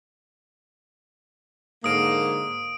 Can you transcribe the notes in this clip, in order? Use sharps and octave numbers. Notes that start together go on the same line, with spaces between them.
G#2 D3 A#3 D#6 D7